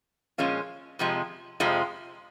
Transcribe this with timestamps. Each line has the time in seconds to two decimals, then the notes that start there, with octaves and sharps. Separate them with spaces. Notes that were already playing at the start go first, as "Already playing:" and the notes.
0.38 A#2 F3 G#3 C#4 F4
0.99 F2 C3 F3 G#3
1.60 F2 C3 F3 G#3